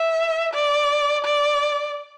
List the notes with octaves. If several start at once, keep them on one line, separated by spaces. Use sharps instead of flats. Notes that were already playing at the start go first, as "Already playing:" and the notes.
Already playing: E5
D5
D5